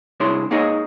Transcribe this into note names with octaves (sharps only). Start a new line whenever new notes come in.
C2 D4 E4 G#4 C#5 C6
A#3 D#4 G#4 C#5 D#5